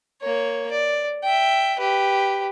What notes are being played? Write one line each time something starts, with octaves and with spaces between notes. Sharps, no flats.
A#3 C#5
D5
E5 G5
G4 B4